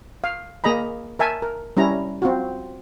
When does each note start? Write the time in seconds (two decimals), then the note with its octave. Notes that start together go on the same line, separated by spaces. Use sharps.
0.24 F5
0.64 A#3 G#4 D#5 A#5 B5
1.19 A#4 E5 G#5 A5
1.42 A#4
1.77 G3 C#4 E4 A#5
2.22 C4 F4 F#4